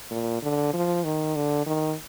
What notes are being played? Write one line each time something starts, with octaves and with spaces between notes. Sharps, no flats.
A#2
D3
F3
D#3
D3
D#3